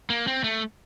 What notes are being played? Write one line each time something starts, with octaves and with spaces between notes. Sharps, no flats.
A#3
C4
A3